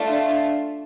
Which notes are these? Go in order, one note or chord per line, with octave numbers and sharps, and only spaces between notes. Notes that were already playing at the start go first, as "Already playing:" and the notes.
Already playing: A3 D4 F4